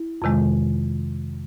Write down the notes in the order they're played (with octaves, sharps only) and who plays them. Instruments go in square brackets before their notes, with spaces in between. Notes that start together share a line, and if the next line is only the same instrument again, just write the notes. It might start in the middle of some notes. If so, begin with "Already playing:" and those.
Already playing: [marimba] E4
F2 C3 D#3 G#3